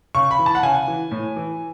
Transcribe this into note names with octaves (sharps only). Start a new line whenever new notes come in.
C#3 C#6
B5
E3
A5
F#5
C#3 G#5
E3
A2
E3